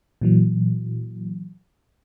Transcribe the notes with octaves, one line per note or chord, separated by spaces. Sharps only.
A#2 E3 F#3